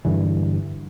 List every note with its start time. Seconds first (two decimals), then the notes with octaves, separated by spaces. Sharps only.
0.05 G2 D3 E3